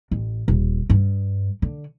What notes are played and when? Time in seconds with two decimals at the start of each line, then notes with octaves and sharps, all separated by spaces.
0.11 A1
0.48 D#1
0.90 G2
1.62 D3